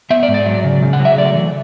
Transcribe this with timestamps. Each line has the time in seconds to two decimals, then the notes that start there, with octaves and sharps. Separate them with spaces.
0.10 B3 E5
0.23 D5
0.28 G#2
0.34 D5
0.46 F#3
0.64 C#3
0.82 C#3
0.93 F#5
1.00 F#3
1.05 E5
1.18 A3 D5
1.35 E3